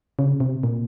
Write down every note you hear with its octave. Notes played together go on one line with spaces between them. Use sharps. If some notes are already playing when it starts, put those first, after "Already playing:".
C#3
C3
A#2